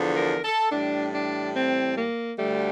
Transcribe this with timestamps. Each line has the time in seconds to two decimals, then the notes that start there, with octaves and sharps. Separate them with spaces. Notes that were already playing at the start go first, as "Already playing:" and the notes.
Already playing: E2 D3 F3
0.17 A#4
0.45 A4
0.72 A2 E3 G3 D4
1.15 D4
1.56 C4
1.97 A#3
2.39 D2 D3 G3 A3